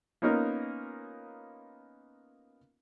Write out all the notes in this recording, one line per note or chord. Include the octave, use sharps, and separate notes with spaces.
A#3 B3 C#4 D#4 F4 A#4